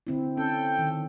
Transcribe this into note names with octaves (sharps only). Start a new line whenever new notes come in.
D3 C4 E4
C#4 A4 G5
D#3